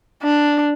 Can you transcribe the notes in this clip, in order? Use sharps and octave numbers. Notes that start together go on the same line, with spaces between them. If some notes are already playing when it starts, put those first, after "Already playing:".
D4